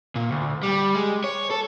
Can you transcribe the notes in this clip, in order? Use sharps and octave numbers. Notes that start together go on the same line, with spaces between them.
A#2
D2
G3
G#3
C#5
A4